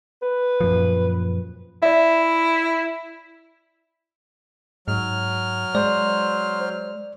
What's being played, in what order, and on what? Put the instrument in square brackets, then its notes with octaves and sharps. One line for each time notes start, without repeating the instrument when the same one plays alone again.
[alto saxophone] B4
[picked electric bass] F#2 A#2 F3
[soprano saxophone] E4 [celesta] D5 E5
[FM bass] G#2 [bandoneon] F#3 F6
[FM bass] G#3 [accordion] C5 [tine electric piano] D5